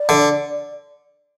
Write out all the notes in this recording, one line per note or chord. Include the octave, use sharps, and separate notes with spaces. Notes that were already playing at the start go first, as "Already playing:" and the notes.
Already playing: D5
D3